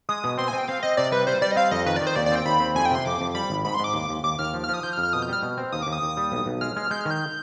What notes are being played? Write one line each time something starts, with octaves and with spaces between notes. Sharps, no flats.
G#3 D#6
B2
C4 C6
G#5
C4
G5
C4 F5
C4 D#5
C3 D5
G3 B4
G3 C5
G3 D5
D#5
C4 F5
F2 D#5
D#3 B4
D5
D#3
C5
D#2 D5
D5
C4 G5
D#2 B5
C4
F2 G#5
G5
C3 C6
F2 D6
F2
G3 B5
G#1
G#2 B5
C6
G#2 D6
D#2
D#2
D#2 D6
D#2 F6
F3
F6
F3
D#6
F3 G6
F6
F2
F6
B2 D#6
G6
G3 F6
B2
C4
D#2 D#6
D6
D#2
D#6
D#2
G3
B1
B1
G#3 F6
G#3 F6
G#3 G6
F6
D#3
G6